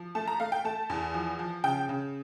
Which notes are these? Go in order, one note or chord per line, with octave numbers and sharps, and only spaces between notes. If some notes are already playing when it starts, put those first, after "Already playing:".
Already playing: F3
A3 A5
A#5
A3 F5
G5
A3 A5
E2
F3
F3
C#3 G5
C#3